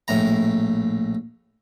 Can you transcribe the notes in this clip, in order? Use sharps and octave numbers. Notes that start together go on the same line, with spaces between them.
A#1 A2 A#5